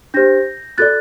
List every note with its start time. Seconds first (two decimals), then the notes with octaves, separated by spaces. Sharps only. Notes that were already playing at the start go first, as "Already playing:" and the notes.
0.14 D4 G4 C5 G6 A#6
0.78 F#4 A4 D5 F#6 A6